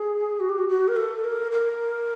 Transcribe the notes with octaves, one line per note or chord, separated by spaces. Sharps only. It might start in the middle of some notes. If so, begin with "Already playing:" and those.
Already playing: G#4
F#4
G4
F#4
F#4
A#4
A4
A#4
A#4